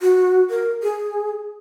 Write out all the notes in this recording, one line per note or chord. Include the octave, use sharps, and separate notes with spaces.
F#4
A#4
G#4